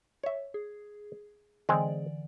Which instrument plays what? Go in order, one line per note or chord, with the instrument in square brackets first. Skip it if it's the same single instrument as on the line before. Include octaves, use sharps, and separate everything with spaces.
[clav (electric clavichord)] C#5 E5
[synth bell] G#4
[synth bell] D3 E3 D5 [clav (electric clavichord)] G#3 C4 G#4